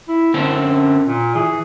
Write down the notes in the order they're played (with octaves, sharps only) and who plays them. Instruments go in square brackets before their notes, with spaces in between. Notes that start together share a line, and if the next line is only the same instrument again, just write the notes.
[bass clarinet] E4
[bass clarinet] F#2 [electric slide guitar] D3 C4 C#4
[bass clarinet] A#2
[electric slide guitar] E3 [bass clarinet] G#4